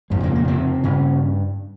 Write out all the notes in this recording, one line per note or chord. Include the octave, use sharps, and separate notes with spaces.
F2 G#2 C#3 G#3
A#2 A#3
A#2 A#3
C3 C4
G2 C#3 C#4